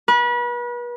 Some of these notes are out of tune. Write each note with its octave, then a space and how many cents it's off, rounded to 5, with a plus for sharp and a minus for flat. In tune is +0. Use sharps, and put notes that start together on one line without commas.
B4 -35